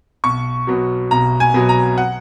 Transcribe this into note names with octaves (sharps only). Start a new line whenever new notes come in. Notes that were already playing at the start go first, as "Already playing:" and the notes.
B1 C#6
B2 F#3
B1 A#5
G#5
B2 F#3
A#5
F#5